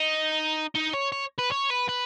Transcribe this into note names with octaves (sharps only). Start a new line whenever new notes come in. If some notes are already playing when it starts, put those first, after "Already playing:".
Already playing: D#4
D#4
C#5
C#5
B4
C#5
B4
B4